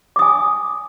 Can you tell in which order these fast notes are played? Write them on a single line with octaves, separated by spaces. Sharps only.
D6 D#6 G#5